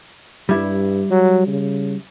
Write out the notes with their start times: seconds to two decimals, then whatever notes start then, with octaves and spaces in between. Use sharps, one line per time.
0.49 G2 G3 E4
1.11 F#3
1.48 C#3